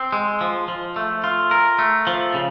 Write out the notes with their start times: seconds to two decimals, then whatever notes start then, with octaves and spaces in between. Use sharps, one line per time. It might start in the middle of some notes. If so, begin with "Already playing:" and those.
Already playing: C4
0.12 G#3
0.41 F3
0.68 F3
0.96 A3
1.24 F4
1.51 A#4
1.79 A3
2.07 F3
2.34 C#3